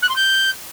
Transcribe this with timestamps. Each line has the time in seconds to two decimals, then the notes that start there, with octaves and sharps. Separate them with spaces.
0.02 F#6
0.09 C6
0.16 G6